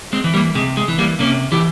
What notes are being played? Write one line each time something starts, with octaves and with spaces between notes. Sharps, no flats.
G#3 C4
E3
G3 A#3
C3 G#3
G#3
E3
G3 A#3
C3 A#3 C#4
E3 E4 G4